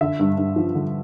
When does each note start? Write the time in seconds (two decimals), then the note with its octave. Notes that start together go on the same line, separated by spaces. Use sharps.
0.01 D3 E5
0.20 G2
0.38 G2
0.56 F3
0.75 D3